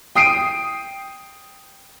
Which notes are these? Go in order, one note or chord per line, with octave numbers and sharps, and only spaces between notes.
G5 D#6 C7 D7 D#7